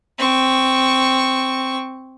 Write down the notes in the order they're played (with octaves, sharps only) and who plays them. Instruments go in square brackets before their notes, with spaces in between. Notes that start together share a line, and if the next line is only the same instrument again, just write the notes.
[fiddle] C4 C#6